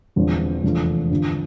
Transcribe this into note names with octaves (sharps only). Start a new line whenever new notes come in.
E1 E2 D3 F3 C4
F1 E2 D3 F3 A3
G1 G2 F3